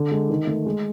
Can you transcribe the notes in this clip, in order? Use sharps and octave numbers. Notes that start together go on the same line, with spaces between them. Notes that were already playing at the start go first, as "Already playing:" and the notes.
Already playing: D3
G#3
D#3
A3
G#3